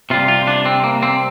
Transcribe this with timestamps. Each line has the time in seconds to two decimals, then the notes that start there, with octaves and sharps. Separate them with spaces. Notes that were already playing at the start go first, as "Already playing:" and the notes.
0.10 C3 G3 F4
0.28 F4
0.47 D4
0.66 C4
0.84 A#3
1.03 C4